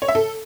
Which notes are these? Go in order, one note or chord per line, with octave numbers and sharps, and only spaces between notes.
C#5
E5
A4